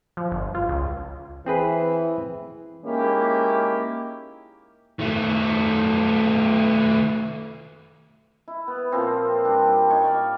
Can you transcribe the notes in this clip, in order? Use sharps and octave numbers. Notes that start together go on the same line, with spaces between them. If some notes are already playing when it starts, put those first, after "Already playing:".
F3
G1
F4
C#2
E3 C4 G#4 B4
G#3 A#3 C#4 D#4 E4 G4
D#3 A3
E4
B3
A#2 F3 C4 C5
G3 D4
D#4 C#5 C#6
D5 F5